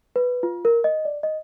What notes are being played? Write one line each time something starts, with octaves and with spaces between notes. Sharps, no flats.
B4
F4
A#4
D#5
D5
D#5